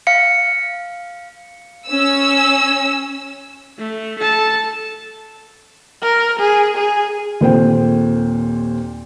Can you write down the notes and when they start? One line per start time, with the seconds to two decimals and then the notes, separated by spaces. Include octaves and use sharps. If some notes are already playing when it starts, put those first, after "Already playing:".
0.07 F5 C#7
1.87 C#4 E6
3.78 A3
4.19 A4 A5
6.02 A#4
6.40 G#4
6.77 G#4
7.41 D#2 A#2 C4 A4 C5 G5